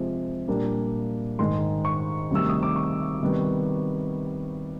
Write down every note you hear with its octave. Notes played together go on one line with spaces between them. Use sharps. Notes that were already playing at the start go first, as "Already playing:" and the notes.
Already playing: C3 F3 G#3
A#2 G3 A#3 D4
G#2 D#3 G#3 C6
C#6
D2 C3 D#3 G3 E6
D#6
D6
C#6
C3 D#3 G3 B3